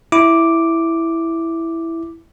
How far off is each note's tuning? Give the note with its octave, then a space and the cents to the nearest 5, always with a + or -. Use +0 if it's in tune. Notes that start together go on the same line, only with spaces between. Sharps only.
E4 +0 D6 +0